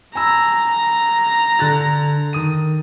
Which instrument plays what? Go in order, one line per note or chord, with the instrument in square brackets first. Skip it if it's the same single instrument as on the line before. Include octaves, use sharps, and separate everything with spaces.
[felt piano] G#5 B5 E6 [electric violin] A#5
[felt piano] D3 F#6 A6
D#3 D#6 D#7